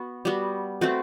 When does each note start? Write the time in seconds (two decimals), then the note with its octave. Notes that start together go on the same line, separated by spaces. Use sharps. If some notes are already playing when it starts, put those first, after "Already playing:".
Already playing: B3 F#4
0.25 G3 B3 F#4
0.81 A3 C4 F#4 B4